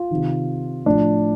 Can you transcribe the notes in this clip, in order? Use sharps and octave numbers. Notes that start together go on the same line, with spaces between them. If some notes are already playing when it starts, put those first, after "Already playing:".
Already playing: F4
C3 D#3
A2 F3 D4